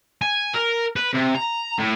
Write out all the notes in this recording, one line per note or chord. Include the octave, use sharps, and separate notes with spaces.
G#5
A#4
B4
C3
A#5
A2